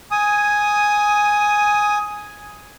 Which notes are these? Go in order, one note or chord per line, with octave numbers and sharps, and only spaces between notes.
G#5 D#6